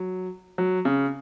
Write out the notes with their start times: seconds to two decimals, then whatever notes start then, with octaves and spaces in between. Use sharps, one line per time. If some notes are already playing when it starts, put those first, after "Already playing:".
Already playing: F#3
0.58 F#3
0.85 C#3